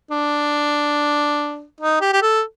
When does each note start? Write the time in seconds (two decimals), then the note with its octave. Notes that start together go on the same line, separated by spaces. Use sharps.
0.11 D4
1.80 D#4
2.01 G4
2.13 G4
2.22 A4